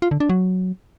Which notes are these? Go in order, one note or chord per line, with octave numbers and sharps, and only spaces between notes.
F4
D3
D4
F#3